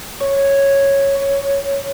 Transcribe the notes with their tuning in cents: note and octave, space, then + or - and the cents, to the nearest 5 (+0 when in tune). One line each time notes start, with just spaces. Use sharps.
C#5 -5
C#5 +10